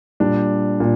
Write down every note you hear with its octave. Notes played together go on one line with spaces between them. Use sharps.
A#2 G3 D4
A#2